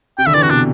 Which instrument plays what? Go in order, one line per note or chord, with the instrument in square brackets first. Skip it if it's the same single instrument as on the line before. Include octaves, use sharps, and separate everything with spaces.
[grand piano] C3 [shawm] G5
[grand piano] D3 [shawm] E5
[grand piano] E3 [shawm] D5
[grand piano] C3 [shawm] F#4
[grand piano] B2 [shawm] D4